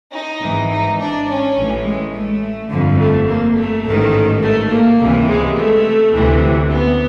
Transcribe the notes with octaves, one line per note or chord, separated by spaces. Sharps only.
D#4
G#1 G#2 E3
D#4
D4
C#4
A1 A2 E3
G#3
A3
G1 F2 D3
A3
A#3
A3
A1 G#2 D#3
A3
A#3
C#2 C3 E3
G#3
A3
D2 C3 E3
B3